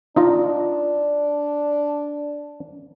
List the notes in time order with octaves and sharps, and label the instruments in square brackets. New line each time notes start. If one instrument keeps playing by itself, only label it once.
[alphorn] D4 [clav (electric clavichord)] D#4 F4 D#5